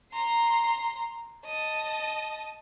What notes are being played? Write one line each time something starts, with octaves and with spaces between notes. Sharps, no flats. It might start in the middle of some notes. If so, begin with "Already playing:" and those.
A#5 C6
D#5 A5